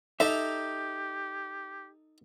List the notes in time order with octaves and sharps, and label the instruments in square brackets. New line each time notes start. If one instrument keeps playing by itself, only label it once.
[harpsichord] D#4 A4 A#5 [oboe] G4 [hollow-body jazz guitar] E5